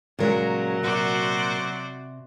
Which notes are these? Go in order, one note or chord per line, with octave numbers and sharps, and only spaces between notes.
A#2 C#3 F#3 G#3 A#4
C3 F#4 C5 D5